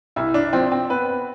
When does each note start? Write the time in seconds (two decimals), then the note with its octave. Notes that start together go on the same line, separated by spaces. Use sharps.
0.16 C2 E4
0.34 D4
0.53 F3 C4
0.72 C4
0.90 B3 B4
1.09 B4